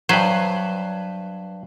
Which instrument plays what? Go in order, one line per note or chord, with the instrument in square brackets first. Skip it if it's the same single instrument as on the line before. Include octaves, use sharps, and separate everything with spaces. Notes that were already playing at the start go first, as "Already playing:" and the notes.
[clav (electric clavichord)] G2 B4 C5 [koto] F#3